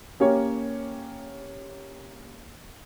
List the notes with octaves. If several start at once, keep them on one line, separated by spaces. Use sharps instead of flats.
A#3 C#4 G4 C#5